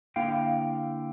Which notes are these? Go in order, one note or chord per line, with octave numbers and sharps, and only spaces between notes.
D3 A#3 E4 F5 G5